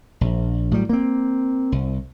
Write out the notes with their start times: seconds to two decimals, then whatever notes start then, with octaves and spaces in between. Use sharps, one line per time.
0.21 A#1
0.71 A2 F#3 G3
0.89 A#3 C4
1.72 C2